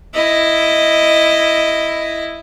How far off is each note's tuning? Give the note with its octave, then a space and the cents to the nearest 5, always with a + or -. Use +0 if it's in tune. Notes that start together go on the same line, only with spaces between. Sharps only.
E4 +5 D#5 +0